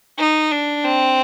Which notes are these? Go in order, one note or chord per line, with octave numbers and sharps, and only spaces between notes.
D#4
D4
C4